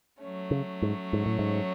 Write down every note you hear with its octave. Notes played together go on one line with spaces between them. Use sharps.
F#3 A3 C#4
C#3
G#2
G#2
A2
G#2